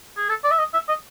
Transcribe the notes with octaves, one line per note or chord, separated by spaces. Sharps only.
G#4
A4
D5
E5
D#5
E5
D#5